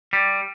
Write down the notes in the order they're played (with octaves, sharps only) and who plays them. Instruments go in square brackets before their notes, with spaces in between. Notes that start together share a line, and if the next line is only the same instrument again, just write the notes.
[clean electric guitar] G3